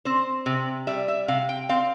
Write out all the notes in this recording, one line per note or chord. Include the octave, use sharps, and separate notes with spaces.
C4 C5
C3
G3 E5
E5
C3 F5
G5
C4 F5